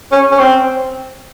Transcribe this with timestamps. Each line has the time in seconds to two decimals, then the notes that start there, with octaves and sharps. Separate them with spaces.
0.12 C#4
0.31 C#4
0.39 C4